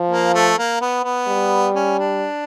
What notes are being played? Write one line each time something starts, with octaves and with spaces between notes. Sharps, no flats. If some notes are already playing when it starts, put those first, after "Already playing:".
Already playing: F3
A#3
A3
A#3
B3
B3
G3
C#4
D4